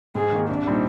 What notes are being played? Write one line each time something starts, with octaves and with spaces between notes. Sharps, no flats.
G#2 G#4
D#3 A#3
C2 D4
A#2 G3 C4 D#4